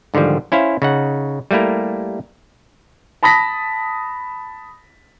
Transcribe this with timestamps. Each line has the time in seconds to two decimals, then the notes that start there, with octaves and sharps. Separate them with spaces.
0.14 G#2 D3 D#3 F3 G3
0.52 C#4 E4 C5 F5
0.82 C#3 D#4 F#5
1.51 G3 A3 A#3 E4 A#4
3.23 A5 B5 D#6 A#6 B6